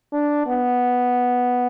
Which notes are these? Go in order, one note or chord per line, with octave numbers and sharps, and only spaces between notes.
D4
B3